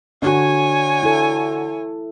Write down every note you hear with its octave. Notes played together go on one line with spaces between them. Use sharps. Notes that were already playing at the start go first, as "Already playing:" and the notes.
D3 F#4 C#5 G#5
E4 A4